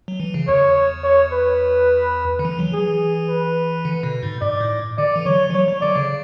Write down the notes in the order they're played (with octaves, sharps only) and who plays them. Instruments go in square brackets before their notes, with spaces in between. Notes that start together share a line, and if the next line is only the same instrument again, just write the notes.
[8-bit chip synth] F#3
E3
C#3
[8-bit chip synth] E2 [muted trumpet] C#5
[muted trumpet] C#5
B4
[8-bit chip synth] D3
E3
F#3
[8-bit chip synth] E3 [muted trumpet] G#4
[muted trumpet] B4
[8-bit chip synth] D3
B2
G#2
[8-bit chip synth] G#2 [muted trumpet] D5
[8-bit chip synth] A2
[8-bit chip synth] D3 [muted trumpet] D5
[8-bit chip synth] E3
[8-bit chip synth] F#3 [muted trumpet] C#5
[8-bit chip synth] E3
[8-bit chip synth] F#3 [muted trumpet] C#5
[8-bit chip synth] F#3
[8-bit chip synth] D3 [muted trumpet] D5
[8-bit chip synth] C#3